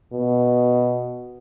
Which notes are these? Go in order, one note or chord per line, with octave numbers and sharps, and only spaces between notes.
B2